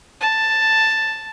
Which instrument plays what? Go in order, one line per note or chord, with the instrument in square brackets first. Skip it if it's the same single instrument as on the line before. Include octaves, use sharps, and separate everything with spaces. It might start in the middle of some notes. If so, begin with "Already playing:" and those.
[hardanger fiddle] A5